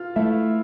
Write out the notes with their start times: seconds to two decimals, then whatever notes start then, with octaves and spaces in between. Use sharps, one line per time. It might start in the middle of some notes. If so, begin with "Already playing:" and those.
Already playing: F4 F5
0.16 A3 E4 E5